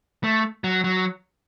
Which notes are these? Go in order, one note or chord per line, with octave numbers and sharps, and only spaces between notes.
A3
F#3
F#3